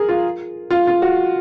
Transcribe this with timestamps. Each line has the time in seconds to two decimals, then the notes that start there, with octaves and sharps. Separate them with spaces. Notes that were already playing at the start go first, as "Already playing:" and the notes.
Already playing: G#4 A#4
0.09 F4
0.70 F4
0.87 F4
1.02 F#4